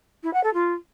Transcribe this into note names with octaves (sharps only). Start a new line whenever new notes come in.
E4
F#5
A4
F4